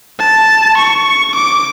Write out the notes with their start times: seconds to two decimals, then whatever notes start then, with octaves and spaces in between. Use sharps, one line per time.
0.19 A5
0.77 C#6
1.35 D6